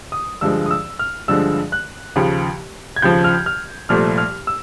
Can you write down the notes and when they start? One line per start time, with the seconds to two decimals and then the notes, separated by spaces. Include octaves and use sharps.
0.12 D#6
0.41 G2 D3 F3 G#3 E6
0.66 D#6
0.71 E6
0.99 F6
1.28 G2 D3 F3 G#3 E6
1.72 F#6
2.16 D#2 C#3 F3
2.96 G#6
3.02 D#2 C#3 F3 G6
3.24 F6
3.46 F6
3.89 C2 A#2 F3 A3 F6
4.18 F6
4.47 E6